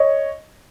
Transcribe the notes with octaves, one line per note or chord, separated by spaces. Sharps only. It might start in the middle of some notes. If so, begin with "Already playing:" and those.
Already playing: C#5 D#5